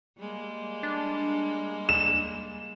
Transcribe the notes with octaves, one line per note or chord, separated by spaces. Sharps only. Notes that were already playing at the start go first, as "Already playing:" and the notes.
G3 G#3 A#3
D4
E7